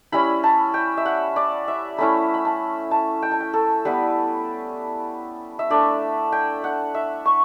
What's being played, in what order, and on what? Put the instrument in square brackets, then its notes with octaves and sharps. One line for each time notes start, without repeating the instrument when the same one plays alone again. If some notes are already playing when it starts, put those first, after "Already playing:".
[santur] G3 C#4 E4 B5
A5
G5
E5
F#5
D5
E5
A3 C#4 E4 B5
B5
A5
A5
G5
A5
G5
A4
G3 B3 E4 B4
E5
A3 D4 D5
G5
F#5
E5
C#6